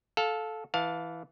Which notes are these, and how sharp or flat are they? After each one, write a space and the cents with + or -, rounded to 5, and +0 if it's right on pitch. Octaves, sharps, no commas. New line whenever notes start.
A4 -10 F5 +15
E3 +0 F5 +20 A5 +0